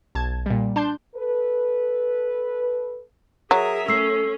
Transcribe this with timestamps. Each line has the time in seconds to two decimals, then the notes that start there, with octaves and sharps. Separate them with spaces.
0.15 B1 A5 G#6
0.46 A#2 G3
0.76 D4 A5 C6 G6
1.16 A4 B4
3.51 F#3 G#4 A#4 E5
3.88 A3 C#4 E6 C7